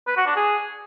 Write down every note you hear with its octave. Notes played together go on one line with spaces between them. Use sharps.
B4
F#4
D4
G#4